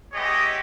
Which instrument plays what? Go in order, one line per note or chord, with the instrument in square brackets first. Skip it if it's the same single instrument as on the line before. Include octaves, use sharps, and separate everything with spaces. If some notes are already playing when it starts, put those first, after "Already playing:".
[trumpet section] G#3 B3 E4 G4 C#5 D#5